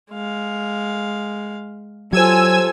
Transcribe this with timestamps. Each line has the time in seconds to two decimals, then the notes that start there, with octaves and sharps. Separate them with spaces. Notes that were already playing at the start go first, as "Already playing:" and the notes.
0.11 G#3 F5
2.13 F#3 F4 G4 A4 C5 G#5 E6 G#6